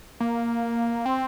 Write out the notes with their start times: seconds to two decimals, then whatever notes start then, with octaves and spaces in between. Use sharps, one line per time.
0.20 A#3
1.05 C4